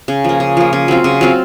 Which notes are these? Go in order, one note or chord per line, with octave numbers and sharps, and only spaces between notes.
C#3
F3 A#3
C#3
F3 A#3
C#3
F#3 C4 F4
C#3
F#3 C4 F4